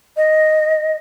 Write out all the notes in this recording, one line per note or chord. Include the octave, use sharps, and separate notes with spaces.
D#5